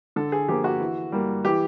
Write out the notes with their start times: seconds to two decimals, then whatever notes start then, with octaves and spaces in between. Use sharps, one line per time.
0.16 D3 A4
0.32 G#4
0.48 F3 A#3 G4
0.64 F#4
0.80 E3
1.12 G3 A#3
1.44 E3 G4